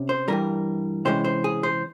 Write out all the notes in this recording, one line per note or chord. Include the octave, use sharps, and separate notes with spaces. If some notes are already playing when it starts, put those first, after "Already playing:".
Already playing: C3 C#4
C5
G2 E3 G3 A#4
C3 E3 G#3 C#4 C5
C5
G#4
C5